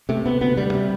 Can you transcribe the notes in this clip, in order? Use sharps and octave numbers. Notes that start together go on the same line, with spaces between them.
C3 A3
C3 B3
D2 B3
D2 G3
C3